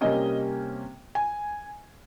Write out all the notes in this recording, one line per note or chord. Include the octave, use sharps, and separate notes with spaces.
C3 G3 A#3 C#4 D#5
G#5